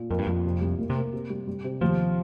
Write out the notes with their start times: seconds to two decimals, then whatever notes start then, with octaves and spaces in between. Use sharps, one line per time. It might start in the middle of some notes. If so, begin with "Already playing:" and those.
Already playing: A#2
0.10 F2 A#4
0.19 G2
0.27 F2 A#2
0.45 C3
0.61 C2
0.79 A#3
0.90 C3
0.96 A#3
1.13 C3
1.30 G3
1.47 G3
1.64 C3
1.81 D#2 F3